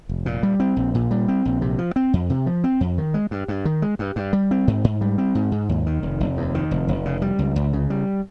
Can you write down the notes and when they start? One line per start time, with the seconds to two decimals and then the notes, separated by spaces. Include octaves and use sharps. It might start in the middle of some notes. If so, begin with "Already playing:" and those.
0.09 F1
0.26 A#2
0.43 G3
0.60 C4
0.76 A#1
0.95 A#2
1.11 G3
1.28 C4
1.45 A#1
1.62 C3
1.79 F3
1.96 C4
2.13 F2
2.30 C3
2.46 F3
2.64 C4
2.81 F2
2.98 D#3
3.14 G#3
3.31 G2
3.48 G2
3.65 D#3
3.82 G#3
3.99 G2
4.16 G2
4.33 G3
4.51 C4
4.67 G#2
4.84 G#2
5.01 G3
5.18 C4
5.35 G#2
5.52 G#2
5.69 D#2
5.86 D#3
6.03 F1
6.20 F1
6.37 D#2
6.55 D#3
6.71 F1
6.88 F1
7.05 C#3
7.22 G3
7.39 C#2
7.56 C#2
7.73 C#3
7.90 G3